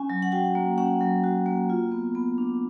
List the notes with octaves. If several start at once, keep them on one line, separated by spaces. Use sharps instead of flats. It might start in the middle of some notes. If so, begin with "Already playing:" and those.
Already playing: C#4 G#5
F#3
F#5
F#4 G5
A#3
C#4 F#5
F#3
F#4
A#3
F4
B3
B3
D4